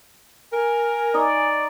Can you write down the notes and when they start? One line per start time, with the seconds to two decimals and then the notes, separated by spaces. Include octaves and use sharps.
0.53 A#4 G#5
1.14 D#4 D5 D#5 C#6